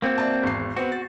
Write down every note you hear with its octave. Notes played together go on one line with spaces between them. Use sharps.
A#3 C4 F#4
D5 E5 A5
G#1 E2 C7
B3 C4 F#4
A6